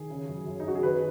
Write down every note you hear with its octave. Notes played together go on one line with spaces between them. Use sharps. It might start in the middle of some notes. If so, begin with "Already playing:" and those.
Already playing: D#3 G#4
C#3
F#2
F#2
D#4
C#3 F#4
G#4
D#3 B4